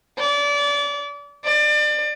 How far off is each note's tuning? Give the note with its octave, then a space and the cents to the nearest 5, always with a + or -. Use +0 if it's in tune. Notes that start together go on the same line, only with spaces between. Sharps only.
D5 -30
D5 +30